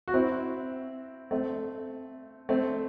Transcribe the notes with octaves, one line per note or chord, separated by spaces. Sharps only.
F#4
C4 E4
A3 C4
A3 C4